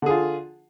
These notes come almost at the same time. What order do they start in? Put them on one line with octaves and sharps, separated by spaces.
D3 G#4 F4